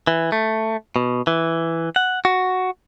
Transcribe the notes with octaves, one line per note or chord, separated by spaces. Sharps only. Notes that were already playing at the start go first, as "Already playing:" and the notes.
E3
A3
B2
E3
F#5
F#4